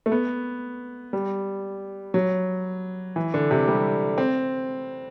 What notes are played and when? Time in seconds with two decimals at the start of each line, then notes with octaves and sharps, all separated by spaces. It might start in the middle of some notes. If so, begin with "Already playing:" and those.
0.06 A3
0.12 B3
1.13 G3
2.14 F#3
3.16 E3
3.34 D3
3.51 C3
3.68 G3
4.18 C4